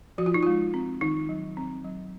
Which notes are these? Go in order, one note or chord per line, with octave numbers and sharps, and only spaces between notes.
F3 F#4
F4
D#4
G#3 F4
C4
D#3 D#4
F#3
C4
F#3